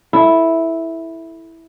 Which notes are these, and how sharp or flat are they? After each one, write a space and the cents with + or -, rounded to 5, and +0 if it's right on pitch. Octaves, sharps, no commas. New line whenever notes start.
E4 -5 A4 +0